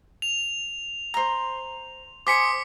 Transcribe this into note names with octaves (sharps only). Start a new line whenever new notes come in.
F7
C5 A#5
C5 G#5 D6 D#6 B6 C#7